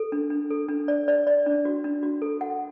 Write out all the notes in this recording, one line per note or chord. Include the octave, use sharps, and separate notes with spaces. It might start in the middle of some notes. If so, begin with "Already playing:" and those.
Already playing: A4
D4
D4
A4
D4
D5
D5
D5
D4
F#4
D4
F#4
A4
F#5